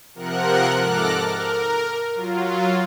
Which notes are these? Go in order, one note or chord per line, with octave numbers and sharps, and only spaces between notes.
C3 F3 A#4 F#5 F#6
G#2 A4 D6 F6 F#6 A#6
A#4
F#3 F4